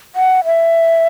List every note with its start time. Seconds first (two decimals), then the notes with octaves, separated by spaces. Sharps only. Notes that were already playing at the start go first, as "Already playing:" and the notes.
0.16 F#5
0.45 E5